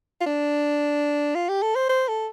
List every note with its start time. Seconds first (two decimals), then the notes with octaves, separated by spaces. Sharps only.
0.21 F4
0.26 D4
1.35 F4
1.49 G4
1.63 A4
1.75 C5
1.89 C5
2.08 A4